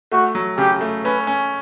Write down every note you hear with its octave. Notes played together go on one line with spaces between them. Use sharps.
A3 F#4
F#3
C#3 G4
A3
C#4 B4
C#4